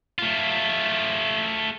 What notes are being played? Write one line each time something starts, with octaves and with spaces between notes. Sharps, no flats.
A3 F4